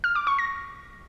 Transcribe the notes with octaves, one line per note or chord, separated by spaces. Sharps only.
F6
D6
C#6
A#6